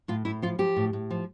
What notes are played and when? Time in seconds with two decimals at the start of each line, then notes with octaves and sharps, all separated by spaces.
0.08 A2 F4
0.25 A2 E4
0.42 F3 F4
0.59 F3 G4
0.76 A2
0.93 A2
1.10 F3